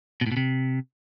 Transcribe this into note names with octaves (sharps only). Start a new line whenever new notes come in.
B2
A2
B2
C3